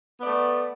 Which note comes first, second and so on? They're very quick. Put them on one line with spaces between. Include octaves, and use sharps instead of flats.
B3 D5 A3